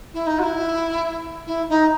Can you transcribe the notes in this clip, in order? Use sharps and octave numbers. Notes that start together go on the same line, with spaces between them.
E4
D#4
F#4
E4
E4
D#4